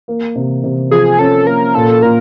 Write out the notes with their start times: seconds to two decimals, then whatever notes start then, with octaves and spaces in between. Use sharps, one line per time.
0.08 A#3
0.36 C3
0.64 C3
0.91 F3 G#4
1.19 C#4 A4
1.46 A#3 A#4
1.75 A#2 A4
2.02 A#2 A#4